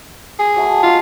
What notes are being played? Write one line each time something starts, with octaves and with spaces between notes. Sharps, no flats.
G#4
F#3 A3 B5
G#3 F4 G4 A#5